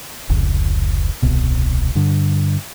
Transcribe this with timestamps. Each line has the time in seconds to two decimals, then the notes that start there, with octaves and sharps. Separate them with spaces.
0.30 F1 C#2
1.22 D#1 C2 B2
1.95 G2 D3